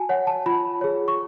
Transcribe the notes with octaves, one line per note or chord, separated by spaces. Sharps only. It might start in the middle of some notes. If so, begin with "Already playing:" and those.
Already playing: F#4 G#5 A5
C#5 F#5
A5
F4 B5
G#4 C#5
C#6